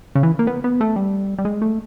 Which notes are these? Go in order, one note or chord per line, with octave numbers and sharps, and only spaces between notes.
C#3
E3
A#3
B3
B3
A3
G3
G3
G#3
A3